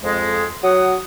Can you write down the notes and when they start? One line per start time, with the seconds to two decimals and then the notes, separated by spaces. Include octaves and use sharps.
0.04 F2 G#3
0.64 F#3 F#5 D#6